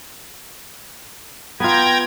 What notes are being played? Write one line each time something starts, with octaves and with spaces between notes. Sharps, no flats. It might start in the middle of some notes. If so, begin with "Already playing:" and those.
B3 F4 G5 A#5 G#6